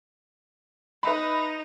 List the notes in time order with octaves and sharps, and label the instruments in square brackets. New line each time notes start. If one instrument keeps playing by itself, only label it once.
[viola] D#4 [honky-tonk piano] B4 E5 B5